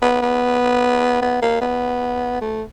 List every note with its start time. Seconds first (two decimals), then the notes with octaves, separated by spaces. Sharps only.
0.02 B3
0.22 B3
1.22 B3
1.42 A#3
1.61 B3
2.42 A3